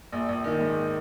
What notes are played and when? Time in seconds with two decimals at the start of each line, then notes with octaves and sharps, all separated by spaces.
0.12 A#1
0.29 A#1
0.44 D#3
0.60 G#2